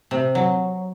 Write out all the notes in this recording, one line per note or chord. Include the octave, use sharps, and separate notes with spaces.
C3
F#3